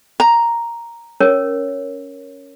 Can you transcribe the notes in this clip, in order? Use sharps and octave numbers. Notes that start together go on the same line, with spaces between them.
A#5
C#4 A#4 C#5